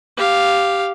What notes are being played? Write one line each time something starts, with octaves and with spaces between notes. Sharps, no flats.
G4 F5